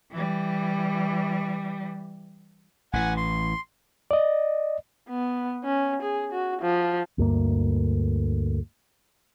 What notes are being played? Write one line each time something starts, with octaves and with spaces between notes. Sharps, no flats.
E3 G3
A1 E3 F#5 G#5
C6
D5 D#5
B3
C#4
G#4
F#4
F3
D2 G2 A#3